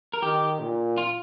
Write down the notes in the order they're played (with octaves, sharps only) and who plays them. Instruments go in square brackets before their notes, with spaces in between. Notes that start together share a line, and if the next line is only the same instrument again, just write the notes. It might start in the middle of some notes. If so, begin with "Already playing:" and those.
[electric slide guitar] A#4
[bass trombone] D#3 [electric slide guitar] G4
[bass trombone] A#2
[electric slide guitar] F4